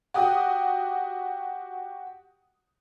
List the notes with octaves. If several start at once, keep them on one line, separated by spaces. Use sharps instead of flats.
F#4 G4 D#6